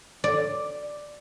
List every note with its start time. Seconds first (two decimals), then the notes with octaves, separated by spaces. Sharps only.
0.24 D5